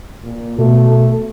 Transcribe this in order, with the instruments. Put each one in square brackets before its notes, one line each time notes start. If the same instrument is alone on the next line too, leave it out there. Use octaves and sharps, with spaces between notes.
[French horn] A#2
[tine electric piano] B2 [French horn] A3